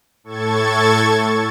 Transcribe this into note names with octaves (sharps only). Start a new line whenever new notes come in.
A2 A4 C#6 G#6 A6